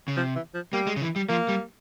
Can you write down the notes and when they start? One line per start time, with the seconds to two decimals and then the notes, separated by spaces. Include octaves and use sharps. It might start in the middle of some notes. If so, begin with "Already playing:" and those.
0.08 C#3
0.16 C3 F3
0.35 E3
0.54 F3
0.73 G3 A#3
0.87 G#3
0.96 C#3
1.02 E3
1.16 G3
1.29 F3 A#3
1.48 G3